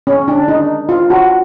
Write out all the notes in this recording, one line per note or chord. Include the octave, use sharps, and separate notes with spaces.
C#4
D4
D#4
F4
F#4